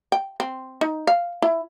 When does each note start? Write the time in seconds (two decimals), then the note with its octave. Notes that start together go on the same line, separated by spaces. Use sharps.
0.12 G5
0.40 C4
0.81 D#4
1.07 F5
1.42 E4